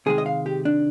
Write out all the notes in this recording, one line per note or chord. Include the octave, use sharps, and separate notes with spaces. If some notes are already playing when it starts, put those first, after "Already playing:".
C3 D#3 G#3 G#4
D#5
F5
G4
D4